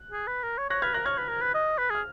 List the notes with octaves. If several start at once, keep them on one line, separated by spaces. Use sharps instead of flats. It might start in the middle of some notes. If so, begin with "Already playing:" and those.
Already playing: F#6
G#4
B4
A#4
C#5
C#5 F#6 A#6
B4 F6 G#6
A#4 F#6 A#6
C#5 F6 G#6
B4
A#4
B4
D#5
B4
G#4 F6